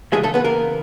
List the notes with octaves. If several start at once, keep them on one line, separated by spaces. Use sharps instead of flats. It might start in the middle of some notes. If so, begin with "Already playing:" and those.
C#3 E3 G#3 A3 G#4
A3 A4
B3 B4
A#3 A#4